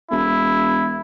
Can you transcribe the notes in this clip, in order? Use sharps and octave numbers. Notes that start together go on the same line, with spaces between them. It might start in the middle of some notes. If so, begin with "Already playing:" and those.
E1 E4